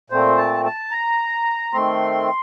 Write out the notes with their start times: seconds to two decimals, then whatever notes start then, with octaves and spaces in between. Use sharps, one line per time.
0.10 A#2 A3 C4 C5
0.38 A5
0.65 A5
0.91 A#5
1.73 D#3 A3 C4 C6